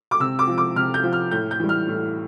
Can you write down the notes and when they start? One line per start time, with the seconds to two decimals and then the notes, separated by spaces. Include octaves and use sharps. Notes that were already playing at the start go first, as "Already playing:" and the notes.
0.11 D6
0.20 C3 E6
0.39 D6
0.48 F3
0.58 D6
0.76 C3 F6
0.94 G6
1.04 F3
1.13 F6
1.31 A2 G6
1.51 G6
1.60 E3 G3
1.69 F6
1.88 A2